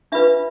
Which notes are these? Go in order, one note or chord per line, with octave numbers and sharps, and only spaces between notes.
D4 F4 B4 E5